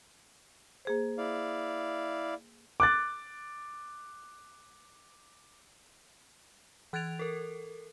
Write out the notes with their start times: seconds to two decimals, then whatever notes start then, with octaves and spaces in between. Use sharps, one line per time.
0.85 A#3 G#4 C5
1.18 E4 D5 F5
2.80 D6 F#6 A6
6.93 E3 F#6 G#6 A6 D7 F7
7.19 A4 A#4